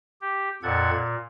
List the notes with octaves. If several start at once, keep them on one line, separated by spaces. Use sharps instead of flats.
G4
F2 A#2 A4 F#5 G#6
A#2